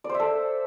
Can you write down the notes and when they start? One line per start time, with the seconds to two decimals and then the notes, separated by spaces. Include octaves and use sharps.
0.04 D5
0.09 C5
0.15 E5
0.20 A4